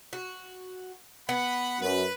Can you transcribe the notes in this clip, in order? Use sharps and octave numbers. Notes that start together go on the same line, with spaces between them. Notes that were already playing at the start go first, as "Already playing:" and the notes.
F#4
B3 F#5 B5
F#2 B4